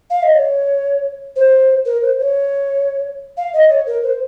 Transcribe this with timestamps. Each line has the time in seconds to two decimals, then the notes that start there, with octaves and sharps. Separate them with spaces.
0.10 F5
0.23 D#5
0.35 C#5
1.36 C5
1.85 A#4
2.02 C5
2.20 C#5
3.37 F5
3.53 D#5
3.70 C#5
3.86 A#4
4.03 C5